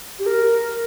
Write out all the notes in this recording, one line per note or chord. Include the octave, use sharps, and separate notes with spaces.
G4
A#4